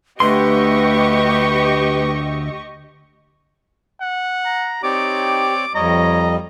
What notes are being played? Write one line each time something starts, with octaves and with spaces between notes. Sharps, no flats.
D2 D3 A3 G4 B4 D#5 C6 C#6
F#5
A#5
C4 D#4 G4 C#5 D5 D6
F2 G3 C#5 D#5 A#5